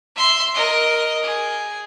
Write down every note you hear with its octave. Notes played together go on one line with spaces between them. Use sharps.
E5 C6
A#4 D#5
G#4